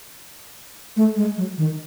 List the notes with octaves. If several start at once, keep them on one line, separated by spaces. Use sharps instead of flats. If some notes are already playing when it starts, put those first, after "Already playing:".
A3
G#3
F#3
D#3